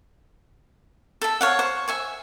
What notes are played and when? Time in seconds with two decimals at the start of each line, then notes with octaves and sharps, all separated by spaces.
1.22 A4 E5
1.41 C#5 F5 F#5
1.59 C5 C#6
1.88 E5 G#5 C#6